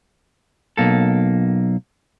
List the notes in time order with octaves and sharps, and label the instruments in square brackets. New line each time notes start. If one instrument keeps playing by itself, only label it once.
[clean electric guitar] B1 A#3 A4